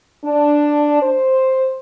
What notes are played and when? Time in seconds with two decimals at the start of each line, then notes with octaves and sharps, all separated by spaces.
0.25 D4
1.01 C5